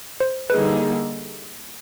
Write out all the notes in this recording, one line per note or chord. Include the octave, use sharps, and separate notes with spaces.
C5
D3 G3 A#3 D#4 G#4 B4